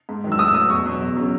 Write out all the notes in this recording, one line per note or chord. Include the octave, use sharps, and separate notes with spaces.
G#2
D#3 F#3
E6
A2 D#6
E6
F#3 D#6
E2 C#6
B2 F#3
E2
C#3 F#3